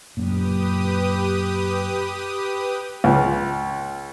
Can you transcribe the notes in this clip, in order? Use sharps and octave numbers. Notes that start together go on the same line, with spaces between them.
F#2 A#2 G4 B4 D#6
C#2